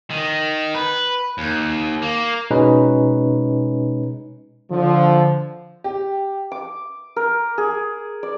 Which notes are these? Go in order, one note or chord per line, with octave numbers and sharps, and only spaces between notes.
D#3
B4
D#2
A#3
B2 G#3 C#4 D#4 B4
D3 F3
G4
D6
A#4
G#4
D5